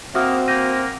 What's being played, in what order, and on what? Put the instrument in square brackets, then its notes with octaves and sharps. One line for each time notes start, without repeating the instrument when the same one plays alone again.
[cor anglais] A#3 [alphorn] C4 [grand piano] F#4 [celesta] E5 D#6 F6
[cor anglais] A#3 [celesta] G6 A#6 D#7